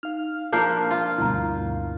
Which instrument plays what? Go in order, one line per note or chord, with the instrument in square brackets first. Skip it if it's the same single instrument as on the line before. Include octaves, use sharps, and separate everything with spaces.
[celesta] D#4 [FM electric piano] F5 F6
[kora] F3 A#3 D4 [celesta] A5 G6 C7
[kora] F4
[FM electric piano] D2 G2 B2 [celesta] E4 F5 A#5